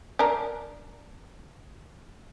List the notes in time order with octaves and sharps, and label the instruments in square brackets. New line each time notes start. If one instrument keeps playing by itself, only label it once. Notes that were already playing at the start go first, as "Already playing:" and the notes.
[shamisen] D4 A#4